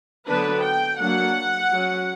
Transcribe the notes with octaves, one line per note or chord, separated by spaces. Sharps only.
D3 F#3 B3 D4 B4
G5
F#3 A#3 D4 F#5
F#3 C#4